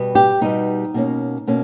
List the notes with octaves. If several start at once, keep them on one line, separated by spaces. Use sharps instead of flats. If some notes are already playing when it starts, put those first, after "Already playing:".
Already playing: B2 G3 B3
G4
B2 G3 B3 D#4
B2 A#3 C#4
B2 A#3 C#4